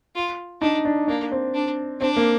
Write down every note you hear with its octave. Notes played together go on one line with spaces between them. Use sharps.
F4
D4 D#4
D4
A#3 D4
C4
D4
C4 D4
A#3